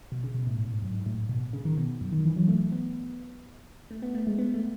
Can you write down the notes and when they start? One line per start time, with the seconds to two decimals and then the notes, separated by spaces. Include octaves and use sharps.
0.12 B2
0.24 C#3
0.34 B2
0.47 A2
0.58 G#2
0.71 G#2
0.82 F#2
0.94 G#2
1.06 A2
1.29 B2
1.53 C#3
1.65 D#3
1.78 B2
2.01 F#2
2.13 D#3
2.25 E3
2.36 F#3
2.48 A3
2.72 B3
3.91 A3
4.02 B3
4.15 A3
4.27 G#3
4.38 B3
4.54 A3